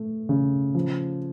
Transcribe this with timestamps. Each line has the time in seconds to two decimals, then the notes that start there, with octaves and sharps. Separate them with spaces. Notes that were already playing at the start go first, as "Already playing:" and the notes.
Already playing: A3
0.29 C#3
0.75 F3